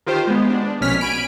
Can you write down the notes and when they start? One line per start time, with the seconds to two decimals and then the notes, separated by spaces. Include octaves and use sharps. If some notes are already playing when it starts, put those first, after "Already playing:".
0.06 D#3 F4 G4 C5
0.27 G#3 B3
0.50 D4
0.81 A#1 B2 C#4 F6 B6
1.01 G#5 B5 D7